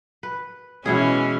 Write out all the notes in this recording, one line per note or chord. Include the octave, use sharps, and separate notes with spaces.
B4
B2 E3 G#3 C#4 E4 G#4